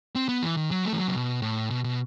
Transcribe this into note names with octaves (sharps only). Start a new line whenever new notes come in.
C4
B3
E3
D#3
F#3
A3
E3
F#3
C3
B2
A2
B2
B2